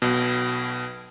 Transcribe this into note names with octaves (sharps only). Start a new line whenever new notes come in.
B1 B2